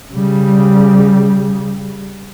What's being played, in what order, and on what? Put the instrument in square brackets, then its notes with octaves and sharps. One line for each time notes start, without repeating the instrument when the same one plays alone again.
[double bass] C#3 G3